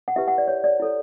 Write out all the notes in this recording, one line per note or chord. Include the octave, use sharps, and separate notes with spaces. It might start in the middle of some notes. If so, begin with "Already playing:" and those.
F#5
E4 G4 B4 E5
F#5
D5
C#5
D5
E4 A4 C#5